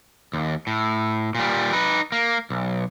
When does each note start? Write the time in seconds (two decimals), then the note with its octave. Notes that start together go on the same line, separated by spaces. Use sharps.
0.33 D#2
0.67 A2
1.35 A#2 G3
1.73 D#4 B4
2.12 A#3
2.50 B1